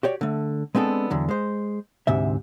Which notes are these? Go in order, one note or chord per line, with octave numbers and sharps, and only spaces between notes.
F#4 G4 C#5 D5
D3 A3
G#3 B3 C4 D4 A4
E2 D3 F#3
G#3 C5
D2 G#2 C3 E5